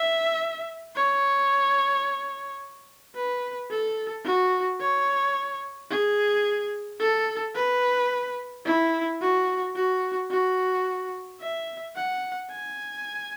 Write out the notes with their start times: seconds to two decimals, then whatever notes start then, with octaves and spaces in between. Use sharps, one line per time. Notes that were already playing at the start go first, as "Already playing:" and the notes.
Already playing: E5
0.95 C#5
3.15 B4
3.70 A4
4.25 F#4
4.80 C#5
5.90 G#4
7.00 A4
7.55 B4
8.65 E4
9.21 F#4
9.75 F#4
10.31 F#4
11.41 E5
11.96 F#5
12.51 G#5